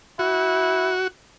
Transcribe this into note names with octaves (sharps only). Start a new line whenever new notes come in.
E4 F#4